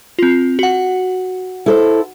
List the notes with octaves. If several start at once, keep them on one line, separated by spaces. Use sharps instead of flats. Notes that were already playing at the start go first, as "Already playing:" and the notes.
C4 F4
F#4 F#5
E4 A4 C5